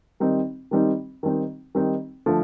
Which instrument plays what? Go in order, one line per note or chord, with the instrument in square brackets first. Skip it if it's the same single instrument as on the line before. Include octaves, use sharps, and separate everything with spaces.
[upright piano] D#3 G3 C4 D#4
D#3 G3 C4 D#4
D#3 G3 C4 D#4
D#3 G3 C4 D#4
D3 F3 A3